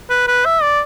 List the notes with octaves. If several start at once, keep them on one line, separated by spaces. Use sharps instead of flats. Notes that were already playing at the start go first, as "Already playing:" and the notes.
B4
B4
E5
D5